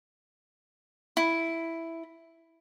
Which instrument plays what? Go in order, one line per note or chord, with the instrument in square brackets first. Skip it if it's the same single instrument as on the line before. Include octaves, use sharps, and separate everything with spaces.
[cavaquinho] E4